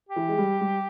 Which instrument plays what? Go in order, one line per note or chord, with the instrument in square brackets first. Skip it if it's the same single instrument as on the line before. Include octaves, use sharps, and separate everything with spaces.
[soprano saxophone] G4
[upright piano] E3
G#3
G3
G3